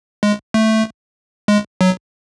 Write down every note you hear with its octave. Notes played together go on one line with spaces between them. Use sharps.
G#3
A3
G#3
F#3